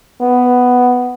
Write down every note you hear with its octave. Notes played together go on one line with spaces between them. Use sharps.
B3